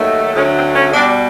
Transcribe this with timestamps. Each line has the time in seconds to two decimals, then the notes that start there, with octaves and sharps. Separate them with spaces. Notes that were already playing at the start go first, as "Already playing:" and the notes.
Already playing: D#2 D#3 F#3 A3
0.35 D2 D3 F#3 A3 C#4
0.54 C4
0.74 C#4
0.94 B2 G3 D4